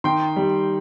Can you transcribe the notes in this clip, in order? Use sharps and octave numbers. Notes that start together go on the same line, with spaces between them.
D#3 G5 C6
G3